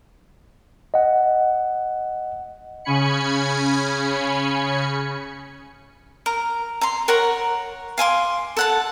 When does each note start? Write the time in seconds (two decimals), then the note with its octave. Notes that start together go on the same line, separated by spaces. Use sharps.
0.94 D#5 F#5
2.84 C#3 C#4 G#5 B5 C#7
6.26 A#4
6.81 A#5 C6
7.08 A#4 C#5 F#5 A#5
7.98 F5 G#5 C6 D6
8.57 A4 F#5 A5